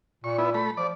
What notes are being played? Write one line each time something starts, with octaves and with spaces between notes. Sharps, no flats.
A#2 C#6
B3 E4
A3 B5
F3 D5